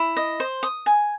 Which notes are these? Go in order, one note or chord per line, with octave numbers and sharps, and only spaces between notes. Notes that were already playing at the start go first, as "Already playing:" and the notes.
Already playing: E4
D#5
C5
D#6
G#5